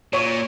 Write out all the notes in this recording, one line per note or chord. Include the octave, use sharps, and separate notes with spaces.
A#2 C#5